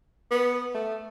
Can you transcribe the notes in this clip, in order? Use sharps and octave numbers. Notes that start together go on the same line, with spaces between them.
B3
A3